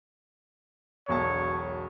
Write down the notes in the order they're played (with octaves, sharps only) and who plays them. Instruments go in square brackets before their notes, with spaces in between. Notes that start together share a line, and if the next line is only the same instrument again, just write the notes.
[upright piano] E1 B1 A5 [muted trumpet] C#5